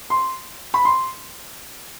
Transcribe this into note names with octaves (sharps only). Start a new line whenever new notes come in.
C6
B5
C6